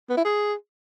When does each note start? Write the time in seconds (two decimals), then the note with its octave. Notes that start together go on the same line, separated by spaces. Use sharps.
0.10 B3
0.17 E4
0.25 G#4